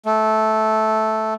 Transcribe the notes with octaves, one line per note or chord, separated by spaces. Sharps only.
A3